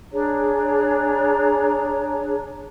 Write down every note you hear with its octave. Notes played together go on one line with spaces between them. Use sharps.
D4 G#4 C#5 A#5